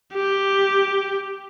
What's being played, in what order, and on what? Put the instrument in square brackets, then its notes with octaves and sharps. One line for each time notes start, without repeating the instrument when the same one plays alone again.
[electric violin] G4